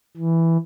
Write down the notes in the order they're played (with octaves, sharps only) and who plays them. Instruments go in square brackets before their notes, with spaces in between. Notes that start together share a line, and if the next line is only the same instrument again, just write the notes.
[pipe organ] E3